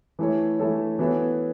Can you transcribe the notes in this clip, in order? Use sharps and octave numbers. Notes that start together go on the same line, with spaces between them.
E3 A3 E4 A4 C#5
E3 A3 E4 A4 C#5
E3 B3 F#4 A4 C#5